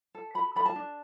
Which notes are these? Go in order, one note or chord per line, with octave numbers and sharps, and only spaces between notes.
A4
F#4 B5
A4 B5
A5
D4